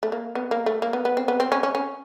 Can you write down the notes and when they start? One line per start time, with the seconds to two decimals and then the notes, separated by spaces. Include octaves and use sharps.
0.03 A3
0.12 A#3
0.35 B3
0.51 A#3
0.66 A3
0.82 A#3
0.93 B3
1.05 B3
1.17 C4
1.28 B3
1.40 C4
1.52 C#4
1.63 C#4
1.75 C#4